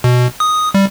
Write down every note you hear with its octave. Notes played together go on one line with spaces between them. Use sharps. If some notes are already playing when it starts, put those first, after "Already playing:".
B2
D#6
G3